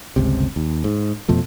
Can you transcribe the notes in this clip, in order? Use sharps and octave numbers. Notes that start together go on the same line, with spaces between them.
G1 C#2 C3
D#2
G#2
F2 B2 F3 A3